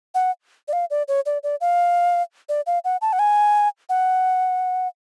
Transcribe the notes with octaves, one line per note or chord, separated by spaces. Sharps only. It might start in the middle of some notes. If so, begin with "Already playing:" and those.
F#5
D5
F5
D5
C#5
D5
D5
F5
D5
F5
F#5
A5
F#5
G#5
F#5